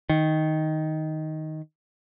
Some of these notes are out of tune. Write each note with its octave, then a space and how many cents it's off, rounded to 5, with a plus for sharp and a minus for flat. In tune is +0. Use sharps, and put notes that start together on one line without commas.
D#3 +5